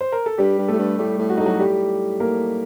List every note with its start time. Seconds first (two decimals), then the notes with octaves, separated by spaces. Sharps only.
0.01 C5
0.12 A#4
0.26 A4
0.38 G2 G3 G4
0.58 G2
0.68 A2 A3 A4
0.78 G2
0.98 A2 G3 G4
1.18 A2
1.30 F#4
1.38 A2 D#4
1.46 F#3 F#4
1.59 A2 G3 G4
2.20 A#3 A#4